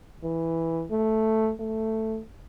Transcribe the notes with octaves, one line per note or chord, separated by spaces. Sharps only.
E3
A3
A3